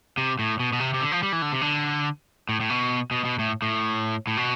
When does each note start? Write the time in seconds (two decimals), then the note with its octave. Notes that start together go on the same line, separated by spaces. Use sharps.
0.18 C3
0.39 A2
0.60 B2
0.73 B2
0.80 C3
0.94 C3
1.01 D3
1.12 F3
1.23 G3
1.32 E3
1.42 D3
1.52 C3
1.61 D3
2.49 A2
2.60 A2
2.70 B2
3.11 B2
3.25 B2
3.39 A2
3.62 A2
4.27 A2
4.37 B2